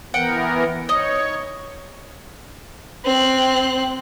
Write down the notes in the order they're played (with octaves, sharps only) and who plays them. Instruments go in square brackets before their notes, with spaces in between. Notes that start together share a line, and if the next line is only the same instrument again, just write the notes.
[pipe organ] E3 B3 A#4 [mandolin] F#5 G5 F#6
[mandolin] D#4 D#5 [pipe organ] C#5
[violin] C4 F#6